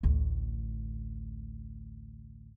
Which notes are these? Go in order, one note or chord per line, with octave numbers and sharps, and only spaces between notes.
A1 D2